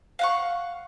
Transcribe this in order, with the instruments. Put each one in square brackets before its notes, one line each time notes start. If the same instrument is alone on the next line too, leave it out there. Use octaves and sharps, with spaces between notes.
[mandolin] F5 F#5 C#6